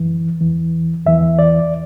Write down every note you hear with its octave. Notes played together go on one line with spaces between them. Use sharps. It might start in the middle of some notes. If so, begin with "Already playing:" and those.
Already playing: F#2 E3
E2 E3
E2 E3 E5
D5